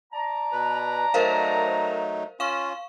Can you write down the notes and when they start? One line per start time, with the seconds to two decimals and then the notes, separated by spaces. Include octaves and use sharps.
0.13 D5 A5 A#5
0.52 B2 B4
1.14 F#3 A3 D#4 A#4 C5 F5
2.40 C#4 F4 F5 C#6